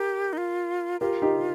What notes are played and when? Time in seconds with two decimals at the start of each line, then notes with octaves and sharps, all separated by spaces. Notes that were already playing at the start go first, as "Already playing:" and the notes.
Already playing: G4 A#4
0.33 D#4
0.38 F4
1.01 F4 G4 A#4
1.22 D#4 G4